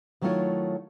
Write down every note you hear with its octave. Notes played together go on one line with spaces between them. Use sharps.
D#3 F#3 A3 E4 F4 C#5